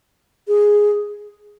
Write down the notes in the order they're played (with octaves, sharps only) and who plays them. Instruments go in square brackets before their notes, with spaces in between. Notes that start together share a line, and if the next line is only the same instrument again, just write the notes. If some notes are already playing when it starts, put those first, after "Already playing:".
[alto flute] G#4